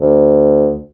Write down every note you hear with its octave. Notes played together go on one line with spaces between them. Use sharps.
D2